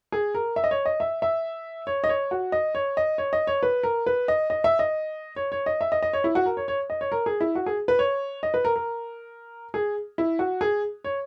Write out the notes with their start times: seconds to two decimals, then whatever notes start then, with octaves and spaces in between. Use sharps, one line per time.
0.12 G#4
0.35 A#4
0.56 E5
0.64 D#5
0.71 C#5
0.86 D#5
1.00 E5
1.22 E5
1.87 C#5
2.04 D#5
2.09 C#5
2.31 F#4
2.52 D#5
2.75 C#5
2.97 D#5
3.18 C#5
3.33 D#5
3.47 C#5
3.63 B4
3.83 A#4
4.06 B4
4.28 D#5
4.50 D#5
4.64 E5
4.79 D#5
5.36 C#5
5.52 C#5
5.66 D#5
5.81 E5
5.92 D#5
6.03 D#5
6.13 C#5
6.24 E4
6.35 F#4
6.46 A#4
6.57 C#5
6.68 C#5
6.90 D#5
7.01 C#5
7.12 A#4
7.26 G#4
7.41 E4
7.55 F#4
7.66 G#4
7.88 B4
7.99 C#5
8.43 D#5
8.54 B4
8.65 A#4
8.76 A#4
9.74 G#4
10.18 E4
10.39 F#4
10.61 G#4
11.04 C#5